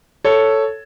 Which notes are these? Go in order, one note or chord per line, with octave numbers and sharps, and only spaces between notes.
A4 C#5